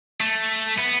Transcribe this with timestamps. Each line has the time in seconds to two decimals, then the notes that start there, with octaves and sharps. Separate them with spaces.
0.21 A3
0.79 B3